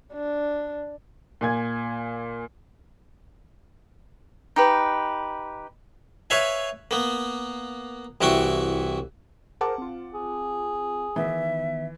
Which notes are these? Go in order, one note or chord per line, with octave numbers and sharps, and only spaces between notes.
D4
A#2 G#5 G#6
D#4 G4 B4
B4 C#5 E5 F5 G#5
A#3 B3
C2 E3 E4 F#4 G5 C#6
G#4 A#4 C5 F#5 A5 D6
C4 F4
G#4
D#3 E3 B3 E5